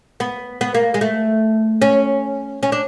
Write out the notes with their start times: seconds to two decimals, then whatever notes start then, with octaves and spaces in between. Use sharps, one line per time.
0.20 B3
0.61 B3
0.74 A#3
0.94 G#3
1.01 A3
1.82 C#4
2.63 C#4
2.72 D4